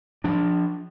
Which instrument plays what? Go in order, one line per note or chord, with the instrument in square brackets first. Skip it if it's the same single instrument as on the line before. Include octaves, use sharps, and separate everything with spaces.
[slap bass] F3 D4